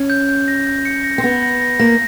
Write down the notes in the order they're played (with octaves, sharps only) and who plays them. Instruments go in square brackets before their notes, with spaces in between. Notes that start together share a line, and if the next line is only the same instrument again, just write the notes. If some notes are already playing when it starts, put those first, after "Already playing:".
Already playing: [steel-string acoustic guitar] C#4
[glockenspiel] G6
G6
A#6
G6
C#7
A#6
[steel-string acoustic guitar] C4
[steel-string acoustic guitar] B3 [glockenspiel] A#6
[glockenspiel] A#6
A#6
[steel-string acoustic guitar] A#3 [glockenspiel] A#6